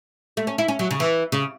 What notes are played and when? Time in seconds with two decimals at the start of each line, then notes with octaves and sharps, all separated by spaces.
0.37 A3
0.47 C#4
0.58 E4
0.68 C#4
0.79 F#3
0.91 C#3
1.00 E3
1.32 C#3